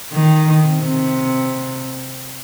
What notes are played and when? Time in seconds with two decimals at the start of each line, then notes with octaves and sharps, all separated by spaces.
0.12 D#3
0.66 C3